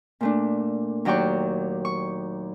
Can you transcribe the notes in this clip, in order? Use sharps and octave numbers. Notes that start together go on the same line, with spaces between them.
A#2 A3 D4
D#2 F#3 F#4 D5 G5 C#6
C#6